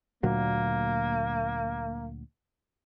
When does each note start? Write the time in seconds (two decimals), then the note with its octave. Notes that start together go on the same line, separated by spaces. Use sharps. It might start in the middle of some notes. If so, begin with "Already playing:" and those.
0.23 D2 A#2 F#3 A#3